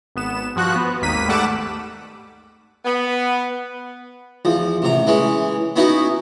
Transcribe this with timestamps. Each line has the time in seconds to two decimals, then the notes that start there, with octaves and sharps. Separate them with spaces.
0.16 G#1 B3 E7
0.56 G2 F3 F#4 F#6
0.76 B3
1.02 G#1 D#2 A#3 B6 D#7
1.28 G#2 G3 A3 F#5 D6 E7
2.85 B3
4.45 E2 F3
4.82 A1 C3 A#5
5.07 E3 G#3 C#4
5.76 B3 C#4 D#4 E4 F#4